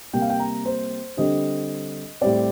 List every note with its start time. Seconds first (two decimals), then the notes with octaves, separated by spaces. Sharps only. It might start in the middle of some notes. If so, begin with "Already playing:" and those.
0.13 C3 G3 A#3 G5
0.22 F5
0.30 G5
0.39 A#5
0.65 C5
1.17 D3 G3 C4 D#5
2.21 A2 G3 C4 D5